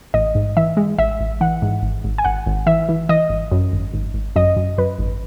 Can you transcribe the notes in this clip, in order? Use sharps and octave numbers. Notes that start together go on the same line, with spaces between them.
A1 D#5
G#2
E3 E5
G#3
A1 E5
A1
E3 F#5
G#2
G#1
G#1
G#5
G#1 F#5
G#1
E3 E5
E3
E3 D#5
G#1
F#2
G#1
G#1
G#1
F#2 D#5
F#2
F#2 B4
G#1